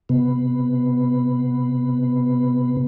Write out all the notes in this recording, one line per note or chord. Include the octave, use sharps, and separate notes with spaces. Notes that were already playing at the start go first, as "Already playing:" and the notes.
C3 B3